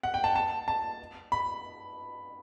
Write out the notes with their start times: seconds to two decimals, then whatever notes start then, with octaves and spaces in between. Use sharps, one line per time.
0.03 F#5
0.14 G5
0.24 A5
0.36 A5
0.68 A5
1.32 B5